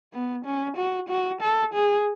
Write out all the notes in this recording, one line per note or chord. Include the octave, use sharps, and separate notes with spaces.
B3
C#4
F#4
F#4
A4
G#4